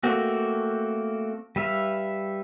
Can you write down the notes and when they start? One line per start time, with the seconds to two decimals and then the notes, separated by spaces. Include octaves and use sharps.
0.04 A3 A#3 C4 F#4
1.56 G3 B4 E5 F5